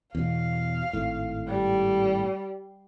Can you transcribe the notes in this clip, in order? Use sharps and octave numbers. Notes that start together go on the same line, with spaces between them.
E2 B2 F5
G#1 A2
G3